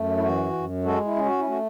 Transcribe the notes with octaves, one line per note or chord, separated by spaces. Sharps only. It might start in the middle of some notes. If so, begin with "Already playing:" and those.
Already playing: F#2 A3
E4
E3 F#4
F#2
G#3 F#4 A4
E4
C#4
F#4
E4
A3 F#4